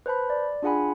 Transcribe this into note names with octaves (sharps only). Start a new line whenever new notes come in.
B4 C5 A5 B5
D5
D4 F4 G#4 F#5 G#5 B5